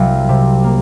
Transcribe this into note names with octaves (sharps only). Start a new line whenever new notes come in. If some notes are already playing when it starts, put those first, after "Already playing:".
Already playing: C2 F#3 A#3 F5
C3
A#3